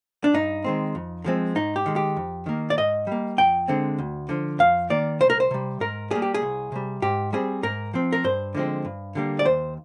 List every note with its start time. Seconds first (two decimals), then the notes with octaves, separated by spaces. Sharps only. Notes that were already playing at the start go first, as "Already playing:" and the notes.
0.24 D4
0.34 G2 D#4
0.64 D#3 G#3 C4
0.95 F2
1.25 D3 F3 G#3 C4
1.55 G#2 D#4
1.76 G4
1.86 D#3 G#3
1.96 G4
2.16 F2
2.46 D#3 A#3
2.70 D5
2.77 G#2 D#5
3.07 G3 A#3
3.38 F2 G5
3.68 D3 G#3 C4
3.98 D2
4.29 D3 F3
4.59 F2 F5
4.90 D#3 A#3 D5
5.20 C2 C5
5.30 A#4
5.40 C5
5.51 C3 G3
5.80 G#2 A#4
6.11 G3 A#3 G#4
6.22 G4
6.34 G#4
6.42 C2
6.72 C3 G3
7.02 G#2 G4
7.33 G3 C4 G#4
7.63 G#2 A#4
7.94 F3 C4
8.13 A#4
8.24 G2 C5
8.55 D3 F3 G#3 C4
8.85 G2
9.15 D3 G3 A#3
9.39 D5
9.45 D#2 C5